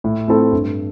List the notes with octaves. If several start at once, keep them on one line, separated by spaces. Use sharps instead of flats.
A2
A3 C4 E4 A4
G2